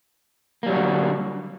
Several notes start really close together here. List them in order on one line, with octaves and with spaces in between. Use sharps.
A#3 G3 F#3 F#4 D3